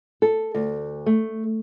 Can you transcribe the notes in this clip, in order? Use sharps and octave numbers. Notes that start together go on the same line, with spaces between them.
A4
D2
A3